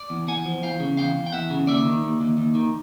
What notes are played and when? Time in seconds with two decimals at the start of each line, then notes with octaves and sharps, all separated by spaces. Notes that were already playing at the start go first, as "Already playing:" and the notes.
Already playing: D5
0.10 E2
0.28 E2 F#5 G#5
0.46 F3
0.63 E2 F5 G5
0.80 C#3
0.97 E2 F5 G5
1.16 E2
1.26 G5
1.32 E2 E5 F#5
1.50 C#3
1.67 D#2 D5 E5
1.85 D#3
2.03 D#2
2.20 D#2
2.37 D#2
2.55 D#3